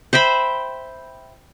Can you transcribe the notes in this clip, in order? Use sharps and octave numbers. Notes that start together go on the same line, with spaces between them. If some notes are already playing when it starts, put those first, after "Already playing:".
C5 E5 G5 B5